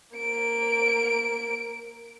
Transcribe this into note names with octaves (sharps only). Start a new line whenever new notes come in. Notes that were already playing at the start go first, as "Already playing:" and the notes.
A#3 D7